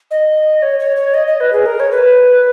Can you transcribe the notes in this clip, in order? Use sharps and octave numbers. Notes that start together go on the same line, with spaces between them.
D#5
C#5
C#5
C#5
D#5
D#5
B4
G#4
A#4
C#5
B4